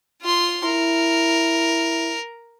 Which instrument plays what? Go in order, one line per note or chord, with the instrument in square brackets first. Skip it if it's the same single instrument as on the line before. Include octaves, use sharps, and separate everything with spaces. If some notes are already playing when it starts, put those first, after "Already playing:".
[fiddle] F4 C6
[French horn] E4 [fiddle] A#4